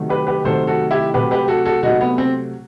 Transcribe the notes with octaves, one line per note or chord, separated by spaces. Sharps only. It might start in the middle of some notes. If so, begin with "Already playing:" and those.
Already playing: C3 D#3 F#3 A3
G4 B4
G4 B4
C3 D#3 F#3 A3 A4 C5
F#4 A4
E4 G4
C3 F#3 A3 G4 B4
G4 B4
F#4 A4
F#4 A4
C3 F#3 A3 D#4 F#4
B3
C4